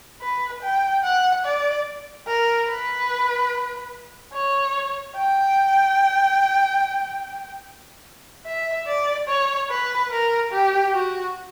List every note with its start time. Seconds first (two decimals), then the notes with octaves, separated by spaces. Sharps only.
0.21 B4
0.62 G5
1.04 F#5
1.45 D5
2.27 A#4
2.69 B4
4.34 C#5
5.16 G5
8.46 E5
8.87 D5
9.28 C#5
9.70 B4
10.11 A#4
10.52 G4
10.93 F#4